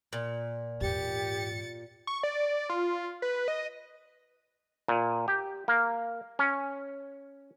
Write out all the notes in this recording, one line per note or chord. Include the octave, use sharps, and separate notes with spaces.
A#2
E2 G#2 G4 A6 C#7
C#6
D5
F4
B4
D#5
A#2
G4
A#3
C#4